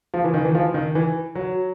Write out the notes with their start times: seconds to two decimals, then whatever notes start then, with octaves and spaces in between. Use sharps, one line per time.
0.14 F3
0.24 E3
0.34 D#3
0.45 E3
0.55 F3
0.74 D#3
0.95 E3
1.35 F#3